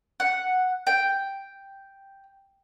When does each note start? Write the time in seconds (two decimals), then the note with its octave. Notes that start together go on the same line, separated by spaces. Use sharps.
0.20 F#5
0.87 G5